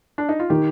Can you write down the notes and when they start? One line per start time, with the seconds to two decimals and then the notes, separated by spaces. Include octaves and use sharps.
0.18 D4
0.29 D#4
0.40 F4
0.50 D#3 G4